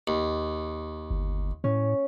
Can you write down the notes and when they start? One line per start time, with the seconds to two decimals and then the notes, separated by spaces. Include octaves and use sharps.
0.07 D#2
1.11 G1
1.64 A2 C#4